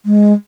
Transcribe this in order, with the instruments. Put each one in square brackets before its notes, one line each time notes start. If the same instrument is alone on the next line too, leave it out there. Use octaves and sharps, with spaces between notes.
[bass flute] G#3